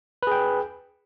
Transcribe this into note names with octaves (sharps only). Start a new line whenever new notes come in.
G#4 B4 G5